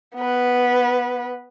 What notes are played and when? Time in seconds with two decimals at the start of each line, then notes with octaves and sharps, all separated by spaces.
0.15 B3 B4